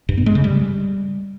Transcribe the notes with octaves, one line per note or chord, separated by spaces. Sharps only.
G2
B3
G#3
C#3
G3